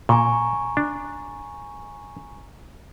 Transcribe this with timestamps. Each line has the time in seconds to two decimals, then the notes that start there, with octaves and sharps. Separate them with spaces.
0.09 A#2 G#5 A#5 C#6
0.77 D4